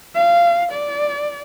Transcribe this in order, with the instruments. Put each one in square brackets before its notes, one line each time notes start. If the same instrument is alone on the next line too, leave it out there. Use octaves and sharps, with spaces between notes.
[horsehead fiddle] F5
D5